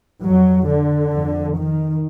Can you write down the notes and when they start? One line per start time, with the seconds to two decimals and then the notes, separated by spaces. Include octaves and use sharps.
0.22 F2 F#3
0.67 D3
1.12 F2
1.57 D#3